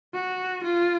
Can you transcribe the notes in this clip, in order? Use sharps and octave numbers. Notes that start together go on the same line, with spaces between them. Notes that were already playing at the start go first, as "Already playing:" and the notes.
F#4
F4